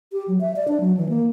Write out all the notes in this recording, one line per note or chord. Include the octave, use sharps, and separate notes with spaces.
G4
F#3
E5
D5
D4
F#3
E3
A#3